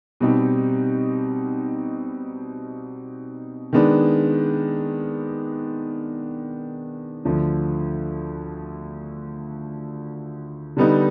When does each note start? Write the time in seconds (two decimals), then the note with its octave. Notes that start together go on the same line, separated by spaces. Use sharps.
0.20 B2 G3 C4 D#4 G4
3.73 D#3 G#3 B3 D4
7.25 D2 D3 F3
10.77 D3 G3 B3 D#4